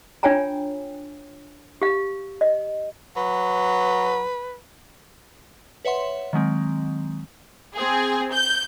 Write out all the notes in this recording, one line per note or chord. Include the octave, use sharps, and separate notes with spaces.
D4 F4 C#5 G5 G#5 A#5
G4 F5
D#5
F#3 B4
B4 C#5 E5 F#5 C6
D#3 F#3 G#3 C4
C4 G#4
G6